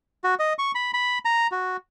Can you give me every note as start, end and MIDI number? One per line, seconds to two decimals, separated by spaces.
0.24 0.35 66
0.39 0.53 75
0.59 0.72 85
0.75 0.91 83
0.94 1.19 83
1.25 1.47 82
1.51 1.77 66